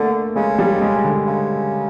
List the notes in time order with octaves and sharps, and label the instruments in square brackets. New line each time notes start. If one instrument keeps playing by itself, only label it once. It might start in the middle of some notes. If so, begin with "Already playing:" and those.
Already playing: [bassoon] D3 [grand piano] A3 A#3
[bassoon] C#3 [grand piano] G#3
[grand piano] G3
G#3
D3
[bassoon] C#3